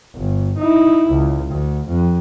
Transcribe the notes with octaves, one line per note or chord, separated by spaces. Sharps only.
G1
D#4 E4
C#2
D2
F2